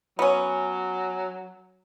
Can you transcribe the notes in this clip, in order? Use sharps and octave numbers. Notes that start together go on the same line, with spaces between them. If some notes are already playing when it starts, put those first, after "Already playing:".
F#3 B3 C#4